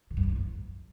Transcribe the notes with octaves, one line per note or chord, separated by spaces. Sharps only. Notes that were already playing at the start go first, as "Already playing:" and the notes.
C#3
G2
F2
A2
F2